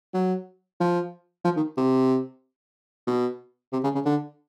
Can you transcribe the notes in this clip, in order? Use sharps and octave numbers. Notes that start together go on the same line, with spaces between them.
F#3
F3
F3
D#3
C3
B2
C3
C#3
C#3
D3